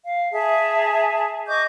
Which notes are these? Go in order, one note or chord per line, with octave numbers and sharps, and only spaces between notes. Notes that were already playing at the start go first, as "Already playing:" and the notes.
F5
G#4 E5 A5
D#5 C#6 D6 G6